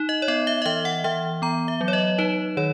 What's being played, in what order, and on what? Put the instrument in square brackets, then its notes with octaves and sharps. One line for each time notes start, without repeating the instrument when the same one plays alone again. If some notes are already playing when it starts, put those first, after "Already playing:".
Already playing: [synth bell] D#4
D#5
C#5
B3 D#5
E5
D#5
E3 E5
F#5
E3 E5
B3 A#5
E5
F#3
C#5
D#5
D#4 B4
D#3 C#5